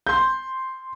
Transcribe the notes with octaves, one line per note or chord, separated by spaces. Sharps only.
C6 G6